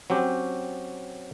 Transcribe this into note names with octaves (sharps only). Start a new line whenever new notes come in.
F#3 C4 C#4 G4